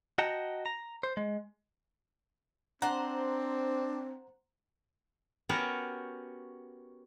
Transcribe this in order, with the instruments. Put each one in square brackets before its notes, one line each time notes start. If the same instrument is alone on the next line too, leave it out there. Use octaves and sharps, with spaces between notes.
[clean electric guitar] F#4 D#5 F#5 G5 A5 A#5
A#5
C5
G#3
[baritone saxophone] C4 [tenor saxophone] D4 [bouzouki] C5 F#5 [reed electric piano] A#5
[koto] B3 C#4 F#4 G4 A#4 B4